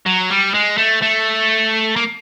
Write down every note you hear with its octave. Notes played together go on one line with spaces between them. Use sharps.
F#3
G3
G#3
A3
A3
A#3